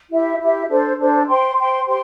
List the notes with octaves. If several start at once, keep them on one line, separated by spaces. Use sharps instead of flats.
E4 G4 E5
E4 G4 E5
D4 A4 C5
D4 A4 C5
C5 G5 C6
C5 G5 C6
G4 C5 G5 C6